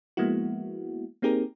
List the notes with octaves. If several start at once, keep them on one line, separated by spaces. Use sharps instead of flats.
F3 G#3 A#3 B3 E4 F#4
A#3 C4 D#4 G4 G#4 A#4